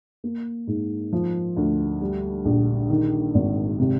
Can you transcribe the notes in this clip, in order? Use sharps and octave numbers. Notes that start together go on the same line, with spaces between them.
A#3
G#2
F3
D2
G3
A#1
D#3
G#1
C3